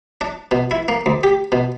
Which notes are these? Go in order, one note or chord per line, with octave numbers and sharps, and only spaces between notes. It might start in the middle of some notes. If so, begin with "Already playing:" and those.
D4
B2
E4
A#3
D2
G4
B2